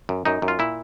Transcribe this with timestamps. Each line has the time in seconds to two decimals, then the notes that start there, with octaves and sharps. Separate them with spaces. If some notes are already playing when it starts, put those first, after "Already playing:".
0.09 F#2
0.25 F#2 D#4
0.42 F#2
0.48 F4
0.59 A#2 E4